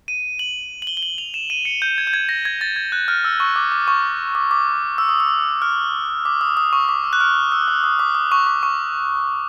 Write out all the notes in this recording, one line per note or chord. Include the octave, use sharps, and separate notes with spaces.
D#7
F#7
F#7
G7
G7
F#7
F7
E7
D#7
C#7
G6
G#6
G6
G#6
A#6
G#6
A6
G#6
F#6
F6
E6
C#6
D6
D6
C#6
D6
D6
E6
D#6
E6
F6
D6
D#6
D#6
C#6
D6
E6
F#6
F6
E6
D#6
D#6
D6
D#6
C#6
D6
C#6